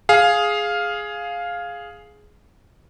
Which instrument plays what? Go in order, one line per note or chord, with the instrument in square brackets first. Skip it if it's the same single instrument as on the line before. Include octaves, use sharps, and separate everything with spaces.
[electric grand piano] G#4 F5